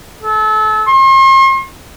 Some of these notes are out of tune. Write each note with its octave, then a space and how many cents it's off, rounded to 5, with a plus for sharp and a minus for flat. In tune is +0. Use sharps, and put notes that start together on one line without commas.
A4 -30
C6 +45